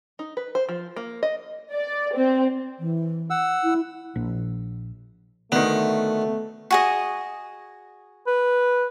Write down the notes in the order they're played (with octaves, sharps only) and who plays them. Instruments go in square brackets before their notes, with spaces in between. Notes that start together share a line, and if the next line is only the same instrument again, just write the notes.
[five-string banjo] D#4
B4
C5
F3
A#3
D#5
[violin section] D5
C4
[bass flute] E3
[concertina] F#5 E6
[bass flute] E4
[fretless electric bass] A#1
[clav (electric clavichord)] D2 D#3 [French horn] A3 [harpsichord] B3
[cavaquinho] F#4 G#4 D#5
[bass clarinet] B4